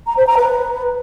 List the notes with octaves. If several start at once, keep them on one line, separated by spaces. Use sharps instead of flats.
A#5
C5
A#5
B4